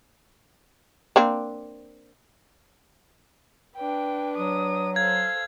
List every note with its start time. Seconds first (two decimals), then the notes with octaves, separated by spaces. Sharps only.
1.16 A#3 C4 D4
3.77 D4 B4 G5
4.37 F#3 D#6
4.96 A4 C5 F5 G#6